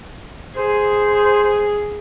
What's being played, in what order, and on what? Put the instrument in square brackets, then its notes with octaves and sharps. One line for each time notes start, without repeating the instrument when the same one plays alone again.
[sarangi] G#4 [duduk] C5